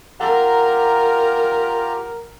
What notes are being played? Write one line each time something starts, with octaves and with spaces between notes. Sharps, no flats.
F4 G4 A#4 F#5 A#5